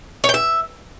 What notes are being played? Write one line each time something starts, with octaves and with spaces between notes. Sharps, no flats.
C#5
G5
E5